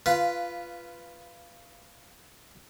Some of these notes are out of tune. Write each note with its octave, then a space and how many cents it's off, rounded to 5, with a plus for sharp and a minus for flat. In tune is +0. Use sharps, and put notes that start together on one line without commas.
F4 -15 B4 +0 F5 +0